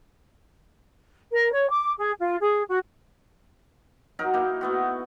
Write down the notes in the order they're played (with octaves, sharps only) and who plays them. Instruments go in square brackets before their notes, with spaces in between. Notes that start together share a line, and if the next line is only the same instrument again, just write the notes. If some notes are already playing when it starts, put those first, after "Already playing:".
[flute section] A#4
C#5
D6
G#4
F4
G#4
F#4
[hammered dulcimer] F#3 D#4 A#4
A#3 D#4 E4
A3 B3 F#4